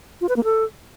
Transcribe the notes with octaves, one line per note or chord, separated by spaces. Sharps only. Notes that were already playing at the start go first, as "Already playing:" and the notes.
F4
B4
A#3
A4